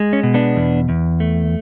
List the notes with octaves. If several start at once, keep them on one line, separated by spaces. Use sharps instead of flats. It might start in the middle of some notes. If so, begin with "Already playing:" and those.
Already playing: G#3
C#4
B2
B3 D4
E2
E2
A3